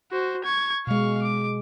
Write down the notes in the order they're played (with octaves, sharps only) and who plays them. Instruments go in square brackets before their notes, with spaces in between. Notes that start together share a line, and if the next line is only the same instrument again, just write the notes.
[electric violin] F#4 C5
C#6 G#6
[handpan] B2 G#3 [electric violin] F5 C#6
[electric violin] D6